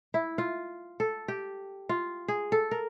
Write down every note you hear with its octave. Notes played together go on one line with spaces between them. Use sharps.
E4
F4
A4
G4
F4
G#4
A4
A#4